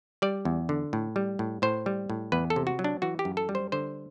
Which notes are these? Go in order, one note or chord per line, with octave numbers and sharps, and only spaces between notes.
G3 D5
E2
D3
A2
G3
A2
A2 C5
G3
A2
E2 B4
A4
C3
F#4
F#3
D4
E3 F#4
G4
F#2
A4
G3
C5
D3 C5